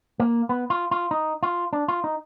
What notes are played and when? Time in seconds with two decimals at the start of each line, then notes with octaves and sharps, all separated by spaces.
0.20 A#3
0.49 B3
0.70 F4
0.91 F4
1.11 D#4
1.43 F4
1.73 D4
1.88 F4
2.04 D#4